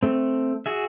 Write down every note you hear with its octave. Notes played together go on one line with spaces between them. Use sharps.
A3 C4
F#4 G#4 E5